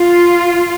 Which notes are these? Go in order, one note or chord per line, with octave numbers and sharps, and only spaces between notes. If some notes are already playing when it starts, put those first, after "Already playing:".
Already playing: F4